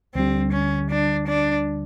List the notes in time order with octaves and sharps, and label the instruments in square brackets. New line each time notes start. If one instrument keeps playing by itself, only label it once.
[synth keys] D2 D3 G3 [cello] C4
[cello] C#4
D4
D4